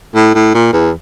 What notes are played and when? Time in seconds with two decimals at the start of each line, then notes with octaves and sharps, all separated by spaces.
0.15 A2
0.35 A2
0.54 A#2
0.73 E2